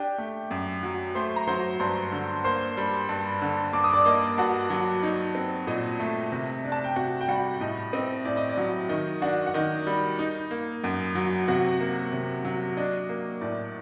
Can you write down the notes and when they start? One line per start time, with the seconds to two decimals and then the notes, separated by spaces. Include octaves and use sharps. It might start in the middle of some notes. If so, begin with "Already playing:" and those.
Already playing: D4 G4 G5
0.18 A3
0.51 F#2
0.83 F#3
1.15 A3 C5 C6
1.36 A#5
1.47 F#3 C5 C6
1.80 G2 C5 C6
2.12 D3
2.44 A#3 C5 C6
2.77 G3
3.09 G2
3.41 D3
3.73 G2 D6
3.84 D#6
3.93 D5 D6
4.06 A#3 D#5
4.38 G2 F#4 F#5
4.70 F#3
5.03 D#4
5.35 C4
5.67 A#2 D#5
6.00 A3
6.32 C3
6.64 D4
6.72 A5
6.84 G5
6.96 C3 F#4 F#5
7.21 G5
7.28 G3 F#4 F#5
7.61 A2 D#5
7.93 C4 D#5
8.25 A2 D5
8.37 D#5
8.49 D5
8.57 F#3
8.89 D#3 D#5
9.22 D4 F#4 F#5
9.47 F#5
9.54 D#3 D#5
9.87 G3
10.19 D#4
10.51 A#3
10.84 F#2
11.15 F#3
11.48 C3 F#4 F#5
11.80 A#3
12.13 C3
12.44 F#3
12.77 D4 D#5
13.09 A#3
13.41 A2 D5